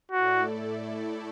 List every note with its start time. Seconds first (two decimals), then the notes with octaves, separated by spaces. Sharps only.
0.12 A2 A3 E4 F#4 A4 D5